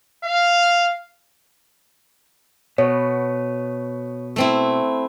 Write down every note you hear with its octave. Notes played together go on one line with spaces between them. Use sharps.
F5
B2 B3 C#5
A3 C4 E4